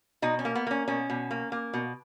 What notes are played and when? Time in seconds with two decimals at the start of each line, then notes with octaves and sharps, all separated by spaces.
0.22 B2 D#4
0.39 C#4
0.45 A#3
0.55 B3
0.67 A#3 C#4
0.88 B2 C#4
1.10 B2
1.31 A#3
1.52 A#3
1.74 B2